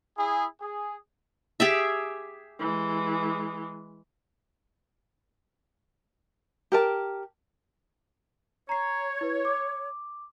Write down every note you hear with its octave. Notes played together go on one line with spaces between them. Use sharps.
E4 G#4
G#4
G4 G#4 E5
E3 G#3
G4 A#4 A5
C#5 A#5 C7
E4 B4
D6